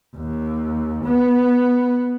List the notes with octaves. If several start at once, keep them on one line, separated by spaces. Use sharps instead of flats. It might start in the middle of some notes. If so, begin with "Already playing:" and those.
D#2
B3